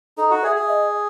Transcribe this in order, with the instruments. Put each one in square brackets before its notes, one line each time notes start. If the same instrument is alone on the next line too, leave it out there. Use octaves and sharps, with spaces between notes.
[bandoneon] D#4 [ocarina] A4
[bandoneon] F#4
[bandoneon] G#4 [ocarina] E5
[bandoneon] G#4
[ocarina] D#5